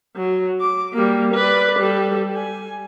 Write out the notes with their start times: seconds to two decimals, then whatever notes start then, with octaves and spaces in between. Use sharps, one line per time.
0.16 F#3
0.61 D6
0.94 G3 A#3
1.34 B4 D5
1.79 G3 A4
2.34 G#5